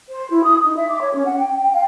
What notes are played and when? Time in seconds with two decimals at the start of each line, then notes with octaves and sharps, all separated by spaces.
0.11 C5
0.32 E4
0.43 D#6
0.64 D#4
0.77 E5
0.89 D6
1.02 C#5
1.14 C#4
1.26 F#5
1.38 G5
1.62 G5
1.73 F5